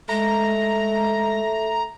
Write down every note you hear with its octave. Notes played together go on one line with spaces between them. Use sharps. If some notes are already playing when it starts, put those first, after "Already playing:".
G#3 A3 A#5